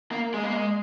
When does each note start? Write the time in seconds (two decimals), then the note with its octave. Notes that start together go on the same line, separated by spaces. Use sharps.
0.12 A#3
0.34 G#3
0.43 A#3
0.53 G#3